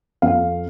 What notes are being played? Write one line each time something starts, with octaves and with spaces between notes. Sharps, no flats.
F2 F5